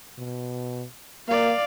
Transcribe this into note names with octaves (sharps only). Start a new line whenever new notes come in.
B2
A#3 D5 F5